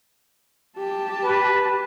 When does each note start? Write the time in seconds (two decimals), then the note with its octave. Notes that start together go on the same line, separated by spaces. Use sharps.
0.78 G4 A5
1.24 B4